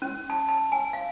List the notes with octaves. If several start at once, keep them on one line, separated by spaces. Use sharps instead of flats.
C#4
A5
A5
G#5
F5